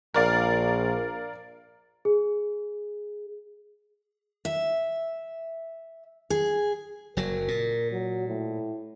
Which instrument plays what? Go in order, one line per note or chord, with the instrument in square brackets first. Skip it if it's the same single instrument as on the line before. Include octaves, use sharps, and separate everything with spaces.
[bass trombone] A#1 [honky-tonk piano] A#4 D5 F5
[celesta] G#4
[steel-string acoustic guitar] E5
G#4
[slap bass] F#1 F#3 [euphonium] A#4
[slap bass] A#2
[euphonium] F#3
A2